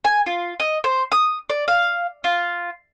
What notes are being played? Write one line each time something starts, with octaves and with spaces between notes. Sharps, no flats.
G#5
F4
D#5
C5
D#6
D5
F5
F4